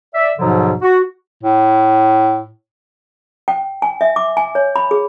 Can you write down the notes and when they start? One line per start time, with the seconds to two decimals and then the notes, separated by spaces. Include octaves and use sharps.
0.14 D5 E5
0.38 E2 G#2 B2 D3 F3 F#3
0.81 F#4
1.43 A2
3.48 G5
3.82 G#5
4.01 E5
4.16 D6
4.37 G#5
4.55 C#5
4.76 B5
4.91 G#4